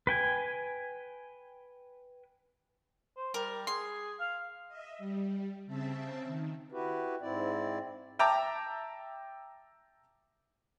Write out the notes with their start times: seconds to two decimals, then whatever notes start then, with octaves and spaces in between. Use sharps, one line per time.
0.07 B4 G5 G#5
3.16 C5
3.34 G3 A#4
3.67 G#4 C6
4.20 F5
4.68 D#5 E5
4.98 G3
5.67 C#3 C4 E5 A5
6.25 D#3
6.72 E4 F#4 G4 B4
7.21 G#2 C4 E4 D5
8.19 E5 G5 A5 A#5 D6